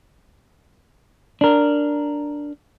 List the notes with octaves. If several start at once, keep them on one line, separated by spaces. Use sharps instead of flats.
D4 A#4